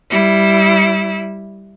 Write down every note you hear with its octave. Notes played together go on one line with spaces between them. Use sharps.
G3 E4